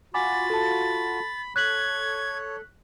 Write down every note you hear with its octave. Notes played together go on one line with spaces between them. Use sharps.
F4 F#4 F#5 G#5 B5 D6 A6
A4 A5
A4 C#5 F#6 G#6 B6 F#7